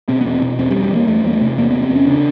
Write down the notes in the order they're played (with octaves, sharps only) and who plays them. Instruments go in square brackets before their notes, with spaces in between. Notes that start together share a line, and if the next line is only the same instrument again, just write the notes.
[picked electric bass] B2 C4
B3
E2 C4
B2
E2 C4
G3
E2
G3
E2 A#3
E2 A3
E2 A#3
A3
C3
E2 A#3
C3 B3
C4
E2
C#4
C#3 D4